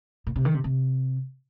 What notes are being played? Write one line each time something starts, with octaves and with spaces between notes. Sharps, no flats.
A#2
C3
D#3
C3
C3